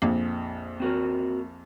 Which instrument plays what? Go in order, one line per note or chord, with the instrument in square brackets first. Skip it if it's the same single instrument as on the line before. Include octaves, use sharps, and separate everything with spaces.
[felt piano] A#1 F2 [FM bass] A#3
[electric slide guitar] C4 F#4 A#4